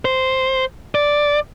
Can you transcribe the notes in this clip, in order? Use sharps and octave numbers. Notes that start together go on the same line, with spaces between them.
C5
D5